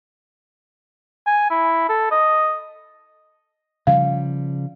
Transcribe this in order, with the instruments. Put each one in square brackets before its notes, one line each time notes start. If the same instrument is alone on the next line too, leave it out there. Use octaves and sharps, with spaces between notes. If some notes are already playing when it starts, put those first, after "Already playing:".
[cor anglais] G#5
E4
A4
D#5
[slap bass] C#3 F3 G3 [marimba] F5